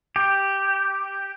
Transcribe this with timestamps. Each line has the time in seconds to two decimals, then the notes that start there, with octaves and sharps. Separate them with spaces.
0.16 G4